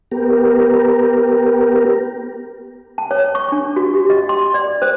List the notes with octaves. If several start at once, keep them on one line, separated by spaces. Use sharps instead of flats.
B3 G4 A#4
A5
C#5
C#6
D4
F#4
G4
D#5
C6
D5
C5